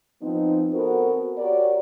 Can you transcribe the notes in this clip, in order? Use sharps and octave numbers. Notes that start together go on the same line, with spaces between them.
F3 B3 C4 D#4
B3 C4 F#4 A4 A#4 C5
F#4 G4 A#4 C#5 D5